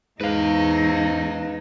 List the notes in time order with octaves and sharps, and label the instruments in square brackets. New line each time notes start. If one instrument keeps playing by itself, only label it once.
[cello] E2 D#4 [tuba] G#2 [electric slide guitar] B4 F5